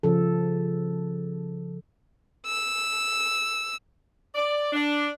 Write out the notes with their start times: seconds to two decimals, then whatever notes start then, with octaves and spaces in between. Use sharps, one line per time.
0.03 C#3 F3 A4
2.46 E6
4.34 D5
4.73 D4